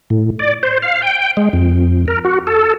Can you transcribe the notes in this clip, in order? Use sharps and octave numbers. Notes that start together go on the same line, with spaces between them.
A2
D5
C5
F5
G5
G#3
F2
A#4
F#4
A4